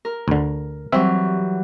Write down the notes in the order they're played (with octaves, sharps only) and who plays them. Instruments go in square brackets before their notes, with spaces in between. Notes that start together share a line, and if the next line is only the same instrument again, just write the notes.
[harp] A#4
[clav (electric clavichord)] D2 D3
[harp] E3 F#3 G3 [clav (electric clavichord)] C4 E5